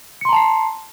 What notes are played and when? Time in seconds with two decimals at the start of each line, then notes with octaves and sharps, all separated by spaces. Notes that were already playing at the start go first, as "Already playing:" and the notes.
0.21 C#7
0.25 C6
0.29 A#5
0.33 A5
0.36 C7